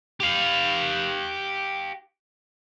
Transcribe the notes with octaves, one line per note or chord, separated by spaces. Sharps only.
G4 F5